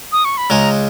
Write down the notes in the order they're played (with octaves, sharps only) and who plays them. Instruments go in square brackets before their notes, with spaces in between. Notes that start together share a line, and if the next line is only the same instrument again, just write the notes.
[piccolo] D#6
C#6
B5
[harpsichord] C#2 C#3 G#3 [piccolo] A#5